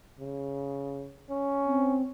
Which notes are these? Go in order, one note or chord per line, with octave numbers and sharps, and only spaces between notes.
C#3
C#4
C4